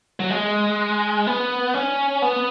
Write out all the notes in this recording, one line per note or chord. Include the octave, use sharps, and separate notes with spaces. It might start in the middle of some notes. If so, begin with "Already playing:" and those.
F#3
G#3
B3
C#4
B3